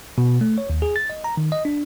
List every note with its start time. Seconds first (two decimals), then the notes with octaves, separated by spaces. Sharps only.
0.18 B2
0.41 A3
0.58 C#5
0.70 D#2
0.82 G#4
0.96 A6
1.10 D#5
1.24 A#5
1.37 D#3
1.52 D#5
1.65 D4